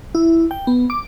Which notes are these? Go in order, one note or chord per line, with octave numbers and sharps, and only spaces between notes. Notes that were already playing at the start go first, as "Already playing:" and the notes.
E4
G5
B3
D6